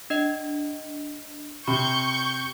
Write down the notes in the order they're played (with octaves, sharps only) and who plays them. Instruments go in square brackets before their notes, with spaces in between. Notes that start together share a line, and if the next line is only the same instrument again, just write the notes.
[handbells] D4 D#5
[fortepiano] C3 [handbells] B5 [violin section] C#6 G6